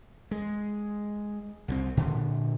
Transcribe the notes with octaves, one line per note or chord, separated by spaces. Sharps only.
G#3
C2 F3 C4
A#2 D3